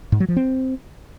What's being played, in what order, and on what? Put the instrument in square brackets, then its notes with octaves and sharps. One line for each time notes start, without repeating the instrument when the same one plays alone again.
[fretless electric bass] G#2
F#3
F3
C4